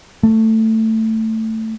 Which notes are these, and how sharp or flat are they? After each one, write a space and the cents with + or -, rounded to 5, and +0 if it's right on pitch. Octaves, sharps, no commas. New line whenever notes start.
A3 +15